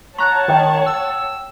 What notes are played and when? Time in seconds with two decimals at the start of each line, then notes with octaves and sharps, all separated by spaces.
0.18 C#5 F#5 A5 A#5 C#6 F#6
0.48 D#3 G5
0.86 E6